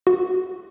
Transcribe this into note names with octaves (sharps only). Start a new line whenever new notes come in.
F#4